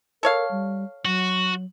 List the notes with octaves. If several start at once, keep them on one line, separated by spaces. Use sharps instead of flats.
A4 A#4 C#5 F5
G3
F#3 F#4